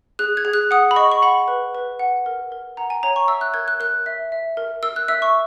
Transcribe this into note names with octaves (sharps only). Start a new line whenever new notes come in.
G#4 F#6
G#6
G#4
F#6
F#5 D#6
B5
D#5 C#6
C#6
F#5 B5
B4
B4
F#5
A#4
A#4
F#5 A#5
G#5
C#5 A#5
C#6
E5 E6
F#6
A#4 G#6
F#6
A#4 F#6
E5
E5
A#4
A#4 E6
F#6
E5 E6
C#6